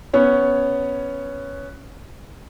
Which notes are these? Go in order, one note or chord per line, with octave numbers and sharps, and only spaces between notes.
B3 C#4 C#5